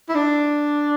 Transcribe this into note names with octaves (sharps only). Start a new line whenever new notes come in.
E4
D4